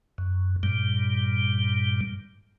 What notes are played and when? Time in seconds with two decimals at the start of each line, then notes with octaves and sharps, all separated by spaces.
0.18 F#2
0.63 G2 A#2 G3